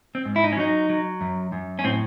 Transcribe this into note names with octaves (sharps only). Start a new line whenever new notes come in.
C4
G#2
E4
D#4
C#4
F#3 D#4
F#3
F#2
F#2
C#4
A2 C4